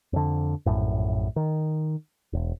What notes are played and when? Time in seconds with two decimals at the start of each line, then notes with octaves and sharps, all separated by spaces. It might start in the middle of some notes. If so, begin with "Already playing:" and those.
0.13 F2 D3
0.66 A#1 F#2 A2
1.36 D#3
2.33 E1